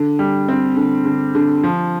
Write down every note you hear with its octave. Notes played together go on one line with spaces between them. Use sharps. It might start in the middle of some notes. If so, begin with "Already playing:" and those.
Already playing: D3
G3
C4
D3
D3
D3
F3